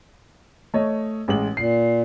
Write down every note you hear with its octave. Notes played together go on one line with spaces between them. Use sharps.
A3 C#5 D#5
A1 G#3 F#7
A#2 C7